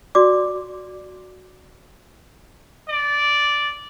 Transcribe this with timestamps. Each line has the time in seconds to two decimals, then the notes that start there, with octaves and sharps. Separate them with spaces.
0.15 F#4 D5 D6
2.89 D5